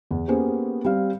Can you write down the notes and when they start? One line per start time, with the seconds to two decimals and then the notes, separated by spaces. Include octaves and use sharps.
0.11 E2
0.28 A#3 B3 C#4 G4 G#4 C5
0.85 G3 C4 G4 F5